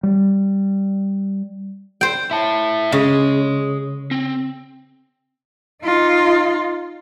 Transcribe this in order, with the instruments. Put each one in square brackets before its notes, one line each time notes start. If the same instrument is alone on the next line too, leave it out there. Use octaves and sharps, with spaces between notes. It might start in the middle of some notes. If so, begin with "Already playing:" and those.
[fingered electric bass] G3
[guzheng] C5 G5
[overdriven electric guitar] E4 A5
[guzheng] C#3 [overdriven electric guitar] G#4 D#5
[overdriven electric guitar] C4
[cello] D#4 F4